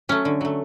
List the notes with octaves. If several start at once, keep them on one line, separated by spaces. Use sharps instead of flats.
F#3 A3 C#4
D3
F#3 A3